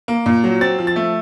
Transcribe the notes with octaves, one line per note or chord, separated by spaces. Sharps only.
A#3
A#2
F#3
C4 A6
F3
A6
A3